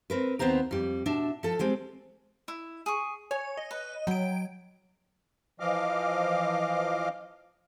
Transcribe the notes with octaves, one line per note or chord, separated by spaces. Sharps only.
C4 A#4 B4
D#2 B3 C4 C5 A#5
F2 G3
B2 D4 E5
F3 A4
G3 G#3 C4
E4
G#4 C#6
C#5 G#5
D#5
B4
F#3 G5 B5 D7
E3 F3 D#5 F5 D6 F6